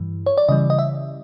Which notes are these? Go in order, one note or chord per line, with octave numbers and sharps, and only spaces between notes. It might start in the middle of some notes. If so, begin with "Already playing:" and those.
Already playing: G2 E3 G3
C#5
D5
C#3 E3 G3 D#5
D#5
E5